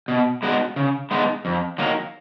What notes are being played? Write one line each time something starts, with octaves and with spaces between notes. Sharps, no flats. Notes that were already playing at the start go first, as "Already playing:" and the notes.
B2
G#3 B3 D#4 F#4
C#3
G#3 B3 D#4
F2
D#3 F#3 A#3